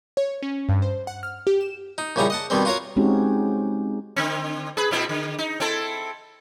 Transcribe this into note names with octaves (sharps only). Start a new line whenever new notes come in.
C#5
C#4
G2
C5
F#5
F6
G4
E7
D#4
A#1 C#3 G3 D#4 E4 A#5
D#5 F#5 A5
B2 D#3 G3 C4
F4 F#4 A#4 C#5 F5
G#3 C4 C#4 D#4 F#4 G4
D3 C4
G#4 B4
A#2 C4 E4
D3
D#4
C4 E4 A4